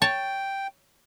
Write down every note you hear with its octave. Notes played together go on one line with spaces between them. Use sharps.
C#5 G5 A5